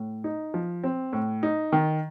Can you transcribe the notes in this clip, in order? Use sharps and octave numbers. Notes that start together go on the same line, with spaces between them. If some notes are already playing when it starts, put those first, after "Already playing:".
Already playing: A2
D#4
F3
C4
A2
D#4
D#3